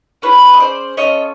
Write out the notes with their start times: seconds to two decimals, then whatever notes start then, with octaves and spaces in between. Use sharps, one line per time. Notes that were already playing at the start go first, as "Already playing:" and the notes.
0.22 C#4 E4 G#4 B4 C#5
0.53 D#5
0.60 C5 D5
0.97 C#4 F4 A4 C#5 D#5